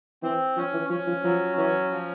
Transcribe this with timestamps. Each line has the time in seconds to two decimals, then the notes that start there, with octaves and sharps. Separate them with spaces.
0.22 E3 C4
0.56 F3 C#4
0.73 E3
0.90 F3 C#4
1.07 F3
1.23 F3 F#3
1.58 E3 C#4
1.91 F3